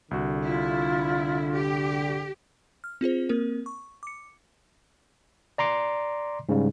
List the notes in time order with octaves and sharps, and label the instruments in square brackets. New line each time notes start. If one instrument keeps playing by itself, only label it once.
[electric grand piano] C2 F#4 [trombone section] D3
[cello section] E4 [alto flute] F4
[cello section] G4
[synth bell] F6
C4 F4 G#4 C5
A#3 C4 A#4
C#6
D6 C#7
[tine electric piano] D5 A#5 C6 D6
G#2 C#3 G3